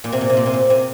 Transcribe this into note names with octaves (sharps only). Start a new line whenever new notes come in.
A#2
C3
A#2
C3
A#2
C3
A#2
C3